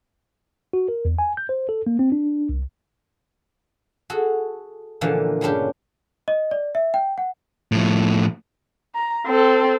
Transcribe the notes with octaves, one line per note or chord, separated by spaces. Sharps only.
F#4
A#4
E2
G#5
G6
C5
A4
A#3
C4
D4
C2
F#4 G#4 A4
A#2 D3 E3 F3 A#3
G2 C#3 C#4 D4 G4
D#5
D5
E5
G5
F#5
A2 F3
A#5
C4 A4